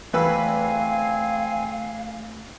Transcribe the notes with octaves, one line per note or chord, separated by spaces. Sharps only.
E2 A3 C4 B4 F5 G#5 E6